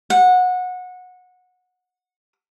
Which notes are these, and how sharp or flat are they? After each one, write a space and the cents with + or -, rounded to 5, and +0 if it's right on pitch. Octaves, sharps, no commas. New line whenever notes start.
F#5 -20